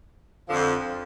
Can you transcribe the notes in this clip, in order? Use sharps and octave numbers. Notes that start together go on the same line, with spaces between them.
F2 D3 F3